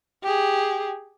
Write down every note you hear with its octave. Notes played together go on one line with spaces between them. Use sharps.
G4 G#4